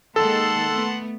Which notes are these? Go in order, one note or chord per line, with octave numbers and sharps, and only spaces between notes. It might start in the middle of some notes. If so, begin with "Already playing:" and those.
D#3 G#3 A#3 A4 F#5 A5 C6
A3 B3